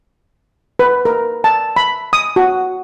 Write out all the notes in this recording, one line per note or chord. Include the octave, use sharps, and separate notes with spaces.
B4
A#4
A5
B5
D#6
F#4